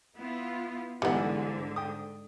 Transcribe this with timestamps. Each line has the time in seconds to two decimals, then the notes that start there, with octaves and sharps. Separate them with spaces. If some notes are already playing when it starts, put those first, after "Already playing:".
0.17 B3 E4 F4
1.02 B1 G#2 D3 E3 G3 B3 D#5
1.76 G5 D#6